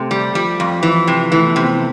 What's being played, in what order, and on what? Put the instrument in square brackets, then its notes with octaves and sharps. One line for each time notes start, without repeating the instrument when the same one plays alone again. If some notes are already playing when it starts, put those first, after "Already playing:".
Already playing: [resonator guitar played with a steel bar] C3 [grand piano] A3
[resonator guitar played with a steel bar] G3
[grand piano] F3 [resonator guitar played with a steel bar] G3
[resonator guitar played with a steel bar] F2
[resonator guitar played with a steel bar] E3 [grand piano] F3
[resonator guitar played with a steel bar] C3
[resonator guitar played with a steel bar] E3 [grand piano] A3
[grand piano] B3
[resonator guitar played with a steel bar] C3 [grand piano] C4
[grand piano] B3